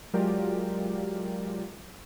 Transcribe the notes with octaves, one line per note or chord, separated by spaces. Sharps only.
F#3 G#3 F4 G4 A#4 D5